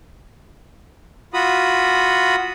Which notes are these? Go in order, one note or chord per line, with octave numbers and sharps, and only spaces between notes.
F4 F#4 B5 D#6